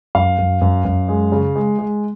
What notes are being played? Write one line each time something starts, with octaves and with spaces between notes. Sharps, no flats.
F#2 F5
F#2
F#2
F#2
G#3
C#3
G#3
G#3